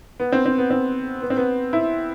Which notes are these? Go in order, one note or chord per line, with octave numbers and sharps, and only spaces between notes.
B3
C4
C4
B3
C4
B3
C4
B3
E4